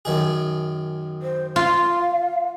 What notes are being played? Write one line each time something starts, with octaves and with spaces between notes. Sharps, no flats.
F#2 D#3 G#4
C5
F4 F5